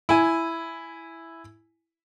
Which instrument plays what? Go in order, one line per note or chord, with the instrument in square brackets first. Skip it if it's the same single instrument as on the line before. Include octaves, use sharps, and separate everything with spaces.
[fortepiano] E4 G#5